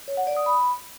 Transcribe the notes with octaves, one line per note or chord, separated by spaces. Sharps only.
C#5
F#5
D5
D#6
B5